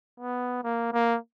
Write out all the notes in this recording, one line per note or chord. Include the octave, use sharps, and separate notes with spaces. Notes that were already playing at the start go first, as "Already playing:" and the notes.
B3
A#3
A#3